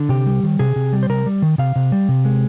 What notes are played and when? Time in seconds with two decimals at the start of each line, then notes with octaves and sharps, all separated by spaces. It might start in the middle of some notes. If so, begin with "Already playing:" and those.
Already playing: D3
0.09 C3 G4
0.26 G3
0.43 D#3
0.59 C3 G#4
0.76 C3
0.93 G3
1.03 C5
1.09 C3 A#4
1.26 G3
1.42 D#3
1.58 C3 F5
1.76 C3
1.92 G3
2.09 C3
2.25 G#3